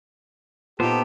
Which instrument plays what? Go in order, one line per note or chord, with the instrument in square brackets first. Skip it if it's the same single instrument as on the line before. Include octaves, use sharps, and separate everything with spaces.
[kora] A#2 D#4 [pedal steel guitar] B3 C5 [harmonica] G4 A4